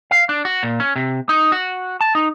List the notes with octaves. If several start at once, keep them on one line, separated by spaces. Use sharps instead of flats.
F5
D4
F#4
A#2
C#4
C3
D#4
F#4
A5
D#4